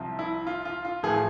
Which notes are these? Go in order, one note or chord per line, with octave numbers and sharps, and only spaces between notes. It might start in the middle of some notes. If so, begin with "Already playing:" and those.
Already playing: C2 C3 F3
E4
F4
F4
F4
A1 A2 F3 G#4